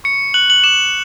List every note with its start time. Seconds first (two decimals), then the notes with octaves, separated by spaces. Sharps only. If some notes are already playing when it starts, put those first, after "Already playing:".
0.04 C#6 C#7
0.34 F#6 F#7
0.50 F#7
0.64 D6 E7